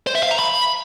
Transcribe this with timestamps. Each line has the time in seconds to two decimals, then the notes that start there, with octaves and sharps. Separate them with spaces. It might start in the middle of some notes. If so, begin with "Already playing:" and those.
0.07 C5
0.15 E5
0.23 F5
0.31 A#5
0.39 B5